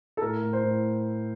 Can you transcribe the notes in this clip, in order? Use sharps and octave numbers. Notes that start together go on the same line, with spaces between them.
A4
A2 A#4
A2
C5
A2